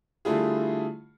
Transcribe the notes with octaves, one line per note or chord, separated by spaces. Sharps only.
D3 G3 A3 E4 F4 G#4